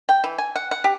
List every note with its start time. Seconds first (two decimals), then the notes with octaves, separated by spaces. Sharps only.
0.09 G5
0.24 E3
0.38 G#5
0.56 F#5
0.71 F#5
0.84 G4